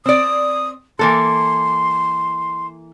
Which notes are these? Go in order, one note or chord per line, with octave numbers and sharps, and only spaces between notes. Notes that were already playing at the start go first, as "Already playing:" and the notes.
C4 D5 D#6
E3 A#3 A4 C6